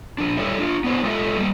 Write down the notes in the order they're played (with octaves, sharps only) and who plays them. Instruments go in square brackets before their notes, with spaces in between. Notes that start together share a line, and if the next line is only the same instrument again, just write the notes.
[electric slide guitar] F3 D4
G3 E4 A4 C#5 D5 E5
D4 F4
B3 D4 E4 B4 C5
G#3 A3 F4 A4 D#5 E5
G3 A#3